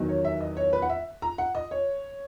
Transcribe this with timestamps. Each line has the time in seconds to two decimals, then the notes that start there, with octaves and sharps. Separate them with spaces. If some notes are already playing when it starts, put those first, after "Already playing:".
Already playing: E2 D#3 F#3
0.08 C#5
0.25 E5
0.40 D#5
0.57 C#5
0.73 B4
0.82 F#5
0.89 E5
1.22 A#5
1.38 F#5
1.55 D#5
1.71 C#5